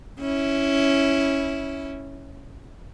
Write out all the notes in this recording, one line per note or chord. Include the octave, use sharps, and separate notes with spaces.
C#4 E4